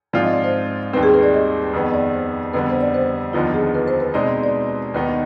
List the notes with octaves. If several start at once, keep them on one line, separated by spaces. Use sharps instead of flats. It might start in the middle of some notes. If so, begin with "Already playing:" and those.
G#2 F3 C4 F4 D5
D#5
D5
C5
D#2 D#3 G3 C4 B4
G#4
B4
D5
D#5
F2 D#3 B3
D5
C5
F2 D3 G3 B3 B4
C5
D5
C5
D#2 D3 F3 B3 D#4 F4
G#4
B4
C5
B4
B2 G#3 C4 D#4 D5
D#5
D5
D#2 D#3 B3 D#4 B4